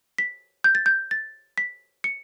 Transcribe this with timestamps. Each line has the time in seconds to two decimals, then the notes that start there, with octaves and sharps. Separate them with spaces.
0.18 B6
0.64 G6
0.75 A6
0.86 G6
1.11 A6
1.58 B6
2.04 C#7